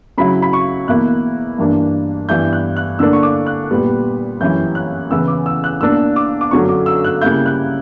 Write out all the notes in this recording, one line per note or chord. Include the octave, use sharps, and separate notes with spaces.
C#3 F#3 C#4 E4 B5
B5
C#6
E2 B2 A#3 E4 F#6
G2 E3 A#3 D4
G2 E3 B3 E4 G6
F#6
F#6
D3 A#3 D4 E6
C#6
D6
F#6
A#2 G3 B3
F#2 E3 G3 C#4 E4 G6
F#6
E2 C#3 E3 B3 E6
D6
E6
F#6
B2 A#3 D4 E6
D6
D6
F#2 D3 F#3 C#4 C#6
D6
E6
F#6
C#3 G3 A#3 E4 G6
F#6